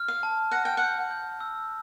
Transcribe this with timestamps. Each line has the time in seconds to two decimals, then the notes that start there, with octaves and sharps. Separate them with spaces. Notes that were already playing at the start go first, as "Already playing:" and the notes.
Already playing: F6
0.08 F5
0.23 A5
0.51 F#5 A#6
0.65 G5
0.77 F#5 G6
1.11 G6
1.40 E6